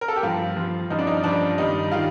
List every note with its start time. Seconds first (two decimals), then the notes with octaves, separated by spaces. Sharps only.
0.01 A#4
0.08 A4
0.16 G4
0.23 G2 F3 F4
0.57 G2 F3
0.90 G2 F3 D#4
0.99 D4
1.07 D#4
1.24 G2 F3 D4
1.58 G2 D#3 G3 D#4
1.92 D#3 G3 F4